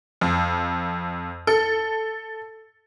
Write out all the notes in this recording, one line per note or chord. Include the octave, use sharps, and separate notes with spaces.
F2
A4